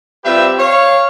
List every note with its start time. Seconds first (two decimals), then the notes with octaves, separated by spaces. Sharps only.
0.24 G3 C4 F4 G4 B4 E5
0.59 C#5 F5